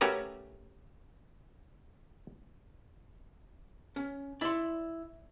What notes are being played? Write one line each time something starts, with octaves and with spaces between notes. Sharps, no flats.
A3 C#4 F#4 G4 A#4 B4
C#4
E4 D5 C6